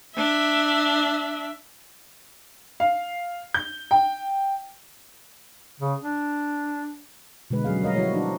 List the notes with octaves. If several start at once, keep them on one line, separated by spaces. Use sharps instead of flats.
D4 E5
F5
G6
G5
C#3
D4
B2 D3 G#3 B4
F#3 C#4 G#4 F5
G3 A#4 D#5 F5
F3 E4 F#4 C#5
F3 D4 D#4 F#4